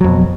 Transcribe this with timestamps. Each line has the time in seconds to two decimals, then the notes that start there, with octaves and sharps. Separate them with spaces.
0.01 F#3
0.04 F2
0.08 B2